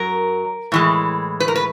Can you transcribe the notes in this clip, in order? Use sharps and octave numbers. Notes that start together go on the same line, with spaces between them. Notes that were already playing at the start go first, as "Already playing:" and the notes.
Already playing: F#2 F#3 A#4
A2 E3 G#3
B4
A#4
B4